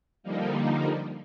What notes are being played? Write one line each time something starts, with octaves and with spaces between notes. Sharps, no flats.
D3 F3 G3 A#3 D#4